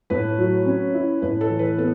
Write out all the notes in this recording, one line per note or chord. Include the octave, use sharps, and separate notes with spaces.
A2 B4
F#3
C#4
E4
A2 B4
A4
E3
B4
B3 A4